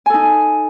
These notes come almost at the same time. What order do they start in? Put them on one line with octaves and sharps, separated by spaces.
G#5 A4 D#4